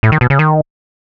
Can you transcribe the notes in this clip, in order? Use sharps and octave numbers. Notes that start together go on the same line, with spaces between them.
A2
D#3
B2
C#3
D#3